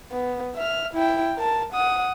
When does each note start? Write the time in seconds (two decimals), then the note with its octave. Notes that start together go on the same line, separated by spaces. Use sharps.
0.12 B3
0.56 E5 F6
0.94 E4 G5
1.36 A#4 A5
1.73 F#5 D#6